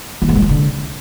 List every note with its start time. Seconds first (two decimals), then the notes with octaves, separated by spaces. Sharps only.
0.22 E3
0.29 G#2
0.35 G#3
0.42 E3
0.49 D3